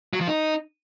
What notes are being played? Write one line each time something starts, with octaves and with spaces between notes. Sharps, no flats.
F#3
F3
D#4